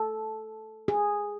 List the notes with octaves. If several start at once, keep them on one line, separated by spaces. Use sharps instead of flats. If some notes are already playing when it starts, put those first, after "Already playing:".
Already playing: A4
G#4